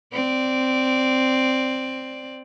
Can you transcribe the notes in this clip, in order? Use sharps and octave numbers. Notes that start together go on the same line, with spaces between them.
C4 D5